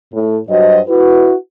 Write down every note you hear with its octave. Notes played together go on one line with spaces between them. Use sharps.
A2
G2 F#3 F#4 C5 D#5
E4 F#4 B4